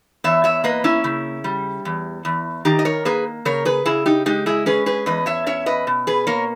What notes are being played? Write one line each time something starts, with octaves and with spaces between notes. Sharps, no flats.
E2 C#5 E5
C#5 E5
A#3 B4 D#5
C#4 E4
C#3
G3
E2
E2
D#3 D#4 G4
D#5
A#4 C#5
A#3 G#4 B4
C#3 A#4 C#5
G#4 B4
C#3 E4 G#4
D#4 G4
G#3 D#4 G4
E4 G#4
C#4 G#4 B4
G#4 B4
E2 B4 D#5
C#5 E5
C#4 C#5 E5
B4 D#5
B2
G#4 B4
A#3 A#4 C#5